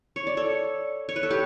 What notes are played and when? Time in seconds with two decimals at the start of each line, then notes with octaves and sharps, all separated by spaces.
0.16 C#5
0.27 D5
0.37 A4 C#5
1.09 C#5
1.16 B4
1.23 A4
1.30 G4 B4